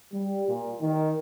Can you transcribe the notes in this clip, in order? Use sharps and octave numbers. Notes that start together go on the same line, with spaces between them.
G3
A#2
D#3